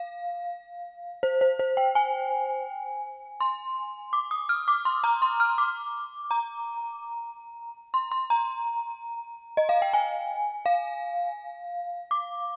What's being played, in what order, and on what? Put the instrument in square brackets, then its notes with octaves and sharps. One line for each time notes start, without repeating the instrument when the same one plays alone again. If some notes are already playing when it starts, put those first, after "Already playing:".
Already playing: [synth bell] F5
C5
C5
C5
G5
G#5
C6
D6
D#6
F6
D6
C6
A#5
C6
F6
D6
A#5
C6
C6
A#5
D#5
F5
G5
G#5
F5
D6